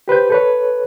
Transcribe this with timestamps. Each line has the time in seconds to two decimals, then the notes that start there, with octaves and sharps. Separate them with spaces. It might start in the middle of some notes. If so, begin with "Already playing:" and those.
0.08 G4 B4 C5 G6
0.30 A4 B4 C#5